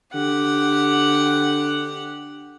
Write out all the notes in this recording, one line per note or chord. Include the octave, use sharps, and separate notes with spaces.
D3 G4 F#5